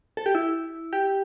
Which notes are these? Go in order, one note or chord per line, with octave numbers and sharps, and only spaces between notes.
A4
G4
E4
G4